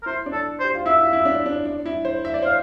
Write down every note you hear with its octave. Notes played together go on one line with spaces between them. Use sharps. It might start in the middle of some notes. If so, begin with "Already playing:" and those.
A#4
E4 C5
D4
A4
C5
G4
F4
E4 E5
F4
E4
D4
D4
D4
E4
C5
E5
D5
C5 F5